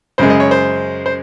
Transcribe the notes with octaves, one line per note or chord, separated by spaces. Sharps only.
F#2 C#3 G#3 C5
D#5
C#5
C5
C5